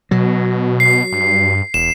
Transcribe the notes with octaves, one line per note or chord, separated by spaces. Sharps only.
B2 F#3
C7
G2
E1 E7